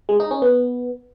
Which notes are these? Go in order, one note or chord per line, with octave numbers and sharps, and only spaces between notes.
G#3
D#4
C#4
B3